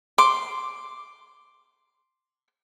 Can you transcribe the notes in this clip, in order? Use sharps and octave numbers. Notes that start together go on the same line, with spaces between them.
C6 D6